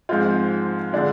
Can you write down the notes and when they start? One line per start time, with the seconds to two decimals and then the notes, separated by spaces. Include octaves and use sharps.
0.09 G#2 F3 G#3 C4 F4
0.93 D3 G#3 D4 F4